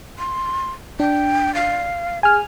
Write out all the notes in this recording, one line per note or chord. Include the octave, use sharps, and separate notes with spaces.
C6
D4 G5
F5
G#4 G#5 F6